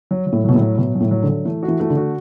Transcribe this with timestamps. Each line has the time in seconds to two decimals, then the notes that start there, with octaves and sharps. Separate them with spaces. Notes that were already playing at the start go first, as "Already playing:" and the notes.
0.11 F#3
0.27 F#3
0.32 A2
0.44 B2 F#3
0.55 A2
0.60 F#3
0.77 B2 F#3
0.95 F#3
1.00 A2
1.11 F#3
1.22 D3
1.29 F#3
1.45 E3 A3
1.63 F#4
1.68 E3
1.80 E3 A3
1.90 D3
1.97 F#4